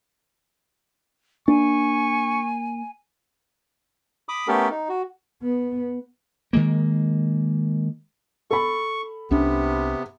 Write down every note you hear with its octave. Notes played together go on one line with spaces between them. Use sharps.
A#3 D4 G#5 C#6
B5 D6 D#6
A3 B3 C#4 G4 A4 A#4
D#4
F#4
B3
D#3 G#3 A#3
A4 B5 C#6
C2 C3 B3 C#4 D4